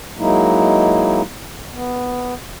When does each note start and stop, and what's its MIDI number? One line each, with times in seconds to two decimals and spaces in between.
0.18 1.22 54
0.18 1.22 56
0.18 1.22 58
0.18 1.22 63
0.18 1.22 64
1.73 2.34 59